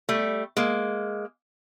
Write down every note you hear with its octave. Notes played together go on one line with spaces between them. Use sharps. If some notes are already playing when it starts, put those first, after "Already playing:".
G3 A3
G#3 A#3